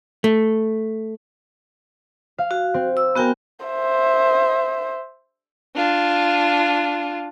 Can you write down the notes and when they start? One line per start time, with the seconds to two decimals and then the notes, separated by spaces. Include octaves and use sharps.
0.24 A3
2.38 F5
2.51 F#4
2.74 C4
2.97 E6
3.15 B3 F#4 A#4 G5 G#5 G6
3.66 C5 E5
5.75 D4 F4